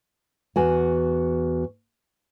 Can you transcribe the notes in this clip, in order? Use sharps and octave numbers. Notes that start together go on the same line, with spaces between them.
E2 F#4 G#5